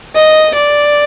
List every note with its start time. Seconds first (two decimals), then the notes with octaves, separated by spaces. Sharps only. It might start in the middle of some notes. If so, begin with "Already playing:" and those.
0.15 D#5
0.54 D5